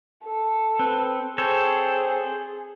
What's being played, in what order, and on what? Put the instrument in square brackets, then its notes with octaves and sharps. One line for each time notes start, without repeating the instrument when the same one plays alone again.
[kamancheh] A4
[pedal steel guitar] C4 [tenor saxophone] B4
[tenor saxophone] C4 [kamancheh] G#4 [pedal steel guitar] A4 C5 C#5